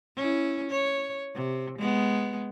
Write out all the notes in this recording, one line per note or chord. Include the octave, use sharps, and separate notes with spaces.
C#4 E4
C#5
C3
G#3 B3